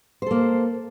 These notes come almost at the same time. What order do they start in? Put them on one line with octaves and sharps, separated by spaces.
C5 A4 A#3